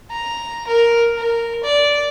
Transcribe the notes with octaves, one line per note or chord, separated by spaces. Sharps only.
A#5
A#4
A#4
D5